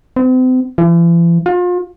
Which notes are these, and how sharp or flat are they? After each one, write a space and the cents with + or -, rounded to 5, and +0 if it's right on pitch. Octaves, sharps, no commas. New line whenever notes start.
C4 -40
E3 +45
F4 +35